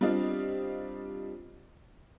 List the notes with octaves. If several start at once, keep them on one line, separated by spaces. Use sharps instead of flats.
G3 C4 D4 F4 D#5